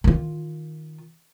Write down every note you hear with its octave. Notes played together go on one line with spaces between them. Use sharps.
D#3 F4